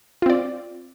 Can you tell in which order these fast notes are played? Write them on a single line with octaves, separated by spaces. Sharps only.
F4 C4 D5